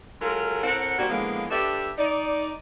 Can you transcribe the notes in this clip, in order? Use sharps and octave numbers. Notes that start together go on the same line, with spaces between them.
F#3 G#3 F4 A4 A#4
A2 C4 A#4 F#5
G3 A#3 C4 D4 F#4
D3 E3 F3 G#3 A#3 B3
A3 D4 G4 B4 E5
D#4 D5